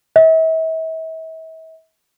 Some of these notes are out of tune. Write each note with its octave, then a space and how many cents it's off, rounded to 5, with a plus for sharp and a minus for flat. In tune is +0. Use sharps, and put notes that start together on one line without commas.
E5 -40